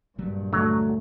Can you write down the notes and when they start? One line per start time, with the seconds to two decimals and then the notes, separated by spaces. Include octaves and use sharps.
0.18 A#1 G2 A#2 F#3 G3
0.53 D1 D3 F#3 A3 D4